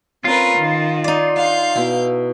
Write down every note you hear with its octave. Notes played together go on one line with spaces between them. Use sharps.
C4 C#4 F4 A#4 B4
D#3 F5
D#4 D5
F5 F#5 G6
B2 E4